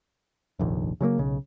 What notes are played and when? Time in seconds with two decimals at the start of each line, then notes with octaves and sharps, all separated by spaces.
0.59 F1 A#1 D#2
1.01 C#3 F#3 A3 A#3
1.18 B1 C#3